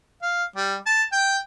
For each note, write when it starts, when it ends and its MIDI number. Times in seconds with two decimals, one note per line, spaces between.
0.23 0.44 77
0.56 0.76 55
0.86 1.03 81
1.12 1.38 79